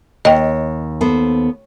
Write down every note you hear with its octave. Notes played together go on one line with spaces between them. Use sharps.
D#2 D#5 G5
B3 A4 C5